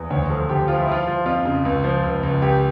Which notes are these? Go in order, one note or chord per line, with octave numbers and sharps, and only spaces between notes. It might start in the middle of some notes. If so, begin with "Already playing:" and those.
Already playing: E2
D2 C#5
F3 A4
D2 G4
F3 F4
E4
F3 F4
F3
F2 F4
C#3
C#2
F3
C#2
C#2
C#2 G4